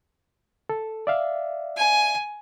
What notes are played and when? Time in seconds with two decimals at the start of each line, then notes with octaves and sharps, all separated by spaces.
0.69 A4
1.07 D5 E5 F5
1.77 G#5